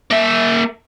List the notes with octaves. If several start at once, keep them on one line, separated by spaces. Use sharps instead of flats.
A#3 E5